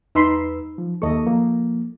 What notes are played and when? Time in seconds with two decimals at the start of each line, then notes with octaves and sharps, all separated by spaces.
0.15 E2 D#4 B4 B5 C6 E6
0.78 F3
1.02 D#2 A#3 A4 D#5 C#6
1.25 F3 A#3